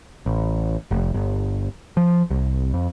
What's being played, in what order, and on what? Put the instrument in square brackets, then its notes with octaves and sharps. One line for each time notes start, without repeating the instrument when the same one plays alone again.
[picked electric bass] A1
F1
G1
F3
C2
F2